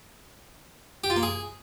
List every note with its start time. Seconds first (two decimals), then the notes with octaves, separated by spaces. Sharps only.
1.04 G4
1.10 F4
1.16 A#3
1.23 G#4